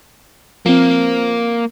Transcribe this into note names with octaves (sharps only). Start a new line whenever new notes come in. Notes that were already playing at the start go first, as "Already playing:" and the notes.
F3 A#3 C4